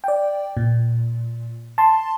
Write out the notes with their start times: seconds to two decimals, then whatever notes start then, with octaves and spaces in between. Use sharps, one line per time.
0.04 D5 G5
0.57 A#2
1.78 A5 C6